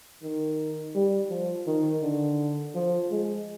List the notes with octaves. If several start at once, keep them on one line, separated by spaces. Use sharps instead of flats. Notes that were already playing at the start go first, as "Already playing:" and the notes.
D#3
G3
F3
D#3
D3
F3
G#3